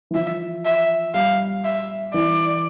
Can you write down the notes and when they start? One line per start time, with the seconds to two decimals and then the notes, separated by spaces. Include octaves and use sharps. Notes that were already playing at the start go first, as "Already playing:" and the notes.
0.11 E3
0.15 F3 E5
0.66 E5
1.14 G3 F5
1.65 E5
2.14 E3 D5